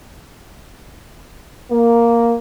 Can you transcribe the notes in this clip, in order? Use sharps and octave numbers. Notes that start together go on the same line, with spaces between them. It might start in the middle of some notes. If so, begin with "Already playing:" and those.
A#3